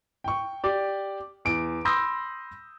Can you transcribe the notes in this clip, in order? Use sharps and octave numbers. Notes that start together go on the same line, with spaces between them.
G5 C#6
G4 D5
E2 D7
B5 C6 D#6 E6 G6 A#6